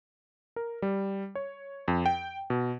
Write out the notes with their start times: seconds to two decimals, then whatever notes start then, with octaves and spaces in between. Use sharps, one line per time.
0.56 A#4
0.82 G3
1.35 C#5
1.88 F2
2.06 G5
2.50 B2